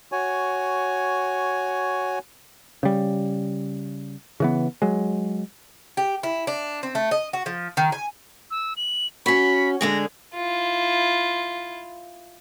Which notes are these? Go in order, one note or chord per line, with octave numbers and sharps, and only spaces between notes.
F#4 C#5 G#5
C#3 G3
C#3 E3 B3
F#3 G#3
G4
E4
D4
C4
A3
D#5
F#4
F3
D#3
G#5
E6
F#7
C#4 F#4 B5
D3 G#3 G#4 A#6
E4 F4